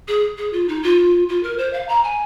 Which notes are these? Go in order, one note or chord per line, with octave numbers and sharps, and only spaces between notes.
G#4
G#4
F4
D#4
F4
F4
A#4
C5
F5
A#5
G#5